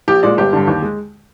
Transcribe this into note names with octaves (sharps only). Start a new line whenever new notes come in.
A#1 G4
A#2 G#3 D5
G1 G4
G2 D3
D#2
G#3